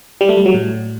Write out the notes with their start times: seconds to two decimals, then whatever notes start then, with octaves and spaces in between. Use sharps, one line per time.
0.21 G3
0.29 A3
0.37 G3
0.46 F#3
0.54 A2